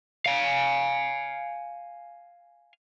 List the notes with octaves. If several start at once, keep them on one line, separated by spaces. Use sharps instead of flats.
F5 G#5